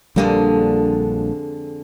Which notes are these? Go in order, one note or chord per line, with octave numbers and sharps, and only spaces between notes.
A#1 F2 D3 G3 G#3 A#3